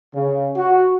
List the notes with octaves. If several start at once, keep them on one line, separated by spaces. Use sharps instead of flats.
C#3
F#4